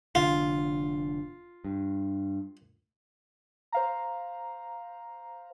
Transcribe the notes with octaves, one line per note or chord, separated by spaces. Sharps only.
F1 D3 F4
G2
C5 F5 A#5